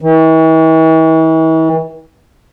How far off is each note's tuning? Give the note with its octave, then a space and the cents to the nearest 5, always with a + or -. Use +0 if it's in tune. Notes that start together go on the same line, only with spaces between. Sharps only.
E3 -40